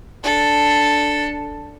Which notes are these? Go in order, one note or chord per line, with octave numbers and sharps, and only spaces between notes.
D4 A4